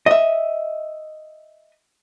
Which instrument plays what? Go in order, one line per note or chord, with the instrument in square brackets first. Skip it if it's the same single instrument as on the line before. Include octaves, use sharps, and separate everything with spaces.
[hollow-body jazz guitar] D#5 E5